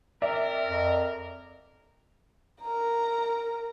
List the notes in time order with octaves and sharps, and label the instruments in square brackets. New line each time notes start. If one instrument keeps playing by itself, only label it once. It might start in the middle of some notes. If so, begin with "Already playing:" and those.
[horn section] C4 A#4 [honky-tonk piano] D5 E5
[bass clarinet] F2
[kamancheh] A#4 A#5